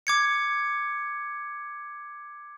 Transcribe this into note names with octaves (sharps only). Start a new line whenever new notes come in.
D6 G#6 C#7